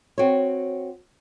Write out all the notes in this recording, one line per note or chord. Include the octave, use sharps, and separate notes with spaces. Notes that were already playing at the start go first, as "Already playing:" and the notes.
C4 F#4 C#5